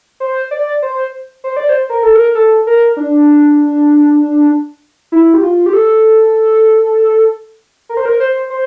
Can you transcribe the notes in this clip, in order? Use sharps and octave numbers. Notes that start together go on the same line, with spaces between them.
C5
D5
C5
C5
D5
C5
A#4
A4
A#4
A4
A#4
D4
E4
G4
F4
G4
A4
A#4
C5
A#4
C5
C5